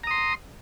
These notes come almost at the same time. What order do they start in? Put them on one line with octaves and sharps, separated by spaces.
A#5 D#6 C6